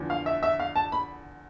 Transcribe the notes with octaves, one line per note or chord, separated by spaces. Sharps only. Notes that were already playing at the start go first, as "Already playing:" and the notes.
Already playing: E2 D3 F3
F5
E5
E5
F5
A5
B5